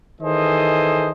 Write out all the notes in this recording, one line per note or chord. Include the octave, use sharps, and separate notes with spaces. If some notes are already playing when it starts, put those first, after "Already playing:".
D#3 E3 G#4 A4 C5 D#5